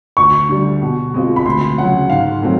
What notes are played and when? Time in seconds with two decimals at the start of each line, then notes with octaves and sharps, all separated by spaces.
0.17 D2 C#6
0.49 D3 G3
0.82 B2
1.14 G#3 C4 F4
1.36 B5
1.46 D2 C6
1.78 C#3 F#3 F#5
2.10 G#2 F5
2.42 D#3 F#3 A3 C4